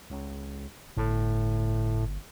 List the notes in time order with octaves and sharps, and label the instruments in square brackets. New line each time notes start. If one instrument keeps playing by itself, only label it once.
[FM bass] C#2
[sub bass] G1 [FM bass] A2